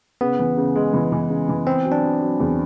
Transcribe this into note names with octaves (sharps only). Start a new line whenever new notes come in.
C#3 B3
E3
C#3
G#3
E3
E3
C#3
E3
B3 C4
F#3
D4
F#3
F#3
E2